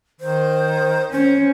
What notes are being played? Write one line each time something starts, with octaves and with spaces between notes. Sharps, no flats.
D#3 C5
C#4 C5